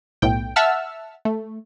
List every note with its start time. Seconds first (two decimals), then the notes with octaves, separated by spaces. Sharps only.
0.22 B1 A2 G5
0.56 E5 F#5 A5 E6 F6
1.25 A3